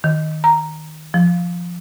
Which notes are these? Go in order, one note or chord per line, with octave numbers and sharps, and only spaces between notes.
D#3
A#5
F3